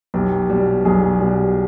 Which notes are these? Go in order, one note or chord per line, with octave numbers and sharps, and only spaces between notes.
B1 G4
B2 G3
B1 G#4
B2 G3